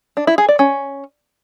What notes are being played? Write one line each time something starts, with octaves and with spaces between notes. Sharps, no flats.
D4
E4
G#4
D5
C#4